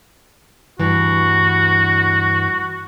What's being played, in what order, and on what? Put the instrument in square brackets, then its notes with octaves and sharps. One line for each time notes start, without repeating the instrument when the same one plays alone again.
[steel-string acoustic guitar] D2 G2 E3 [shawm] F#4